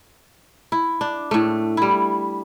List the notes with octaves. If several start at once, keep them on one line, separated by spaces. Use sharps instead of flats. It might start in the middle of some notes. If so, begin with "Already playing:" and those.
E4
D4
A2 A3
G3 E4